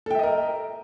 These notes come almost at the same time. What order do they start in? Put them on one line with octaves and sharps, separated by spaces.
A4 G5 E5 D#5 A#4